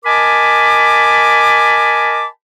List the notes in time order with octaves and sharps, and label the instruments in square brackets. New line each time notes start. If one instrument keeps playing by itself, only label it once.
[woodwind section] A#4 D#5 G#5 A5 B5 D6